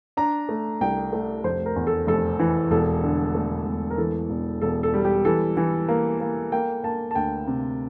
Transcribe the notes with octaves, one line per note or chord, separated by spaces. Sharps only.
D4 A#5
A3
C2 G5
A3
F1 C5
A#4
E2
A4
F1 A4
E3
E1 A4
D3
A3
E1
A#4
E3 A4
E1
E1 A4
A4
G3
G4
E3 A4
E3
A#3
A#3
A#3 G5
A#3 A5
A5
D2 G5
C3